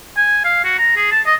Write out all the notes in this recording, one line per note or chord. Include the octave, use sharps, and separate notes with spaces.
G#5
F5
F#4
A#5
G#4
A5
D#5